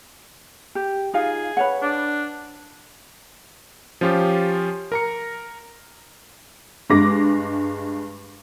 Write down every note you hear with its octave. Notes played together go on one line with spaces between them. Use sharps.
G4
D#4 F4 G#4 F5
B4 C#5 F#5
D4
F3 C#4 F4 G4
A#4 A#5 C#7
G2 G#3 D6 A#6